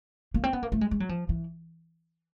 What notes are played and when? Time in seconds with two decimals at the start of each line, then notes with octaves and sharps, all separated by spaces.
0.34 A#3
0.44 C4
0.53 B3
0.63 A#3
0.72 A3
0.81 G#3
0.91 G#3
1.00 F#3
1.09 F3
1.29 E3